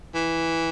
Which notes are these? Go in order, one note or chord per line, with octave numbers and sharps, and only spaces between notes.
E3